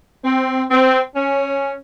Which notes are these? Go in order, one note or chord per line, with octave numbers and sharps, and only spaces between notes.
C4
C4
C#4